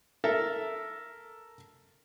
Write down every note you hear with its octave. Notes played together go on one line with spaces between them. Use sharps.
A4 A#4 E5